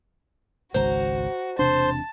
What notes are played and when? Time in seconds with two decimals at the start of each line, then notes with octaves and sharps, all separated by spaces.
0.74 G#1 C#2 F#4 C5 A#5
1.59 E1 C3 D4 C5 A5 C6